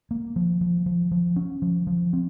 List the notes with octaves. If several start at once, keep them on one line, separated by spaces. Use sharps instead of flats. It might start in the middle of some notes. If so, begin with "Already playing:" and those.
A#3
F3
F3
F3
F3
C#4
F3
F3
C4